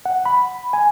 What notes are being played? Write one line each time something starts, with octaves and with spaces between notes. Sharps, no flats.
F#5
B5
G#5